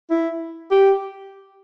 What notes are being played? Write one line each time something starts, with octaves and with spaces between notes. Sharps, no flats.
E4
G4